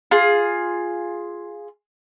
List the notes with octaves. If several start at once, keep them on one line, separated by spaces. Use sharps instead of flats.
F4 G#4